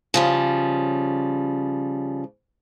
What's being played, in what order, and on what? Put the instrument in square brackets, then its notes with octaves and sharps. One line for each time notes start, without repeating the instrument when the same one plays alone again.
[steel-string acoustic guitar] C#3 F3 G3